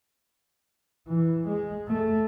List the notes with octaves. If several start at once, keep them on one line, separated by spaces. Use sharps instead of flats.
E3
G#3
A3